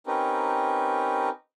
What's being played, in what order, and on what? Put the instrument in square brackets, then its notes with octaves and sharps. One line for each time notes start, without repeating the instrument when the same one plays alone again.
[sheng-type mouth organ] C4 C#4 D#4 G4 A#4 B4